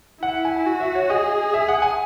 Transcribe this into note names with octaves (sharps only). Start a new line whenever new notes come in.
E4 F#5
G#5
F#4
E5
C#5
G#4 D#5
E5
F#5
G#5